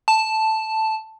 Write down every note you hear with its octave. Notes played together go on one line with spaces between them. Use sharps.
A5